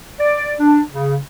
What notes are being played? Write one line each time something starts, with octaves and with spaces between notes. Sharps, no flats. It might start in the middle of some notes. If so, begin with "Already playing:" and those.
D5
D4
C#3